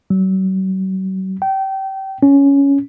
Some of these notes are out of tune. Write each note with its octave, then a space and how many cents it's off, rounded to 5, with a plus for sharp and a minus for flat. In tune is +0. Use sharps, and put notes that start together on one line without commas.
F#3 +40
G5 -25
C#4 +10